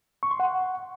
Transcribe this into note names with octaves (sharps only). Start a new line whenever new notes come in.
C#6
C6
F#5